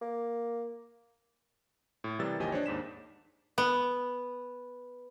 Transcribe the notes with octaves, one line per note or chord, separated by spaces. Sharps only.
A#3
A2
C3 E3 G3 A#4 E6 A6
G#1 D#2 F3 G4 D#5 G#5
D4 C5 C#5
D#2 G#2 B6 E7
B3